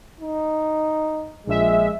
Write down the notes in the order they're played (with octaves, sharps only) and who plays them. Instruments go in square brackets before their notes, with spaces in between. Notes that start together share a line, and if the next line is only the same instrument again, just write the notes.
[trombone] D#4
[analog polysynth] A#1 E5 [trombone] G#3